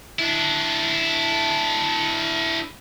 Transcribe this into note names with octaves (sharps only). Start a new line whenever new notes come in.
D4 E4